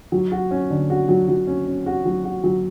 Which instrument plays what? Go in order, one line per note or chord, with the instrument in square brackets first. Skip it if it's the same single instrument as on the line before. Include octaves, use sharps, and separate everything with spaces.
[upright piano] F#3
F#4
C#4
D3
F#4
F#3
F#3
C#4
C#4
F#4
F#3
F#4
F#3